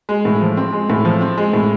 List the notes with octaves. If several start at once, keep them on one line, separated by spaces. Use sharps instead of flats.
G#3
A2
F3
C4
G#3
A2
F3
C4
G#3
A2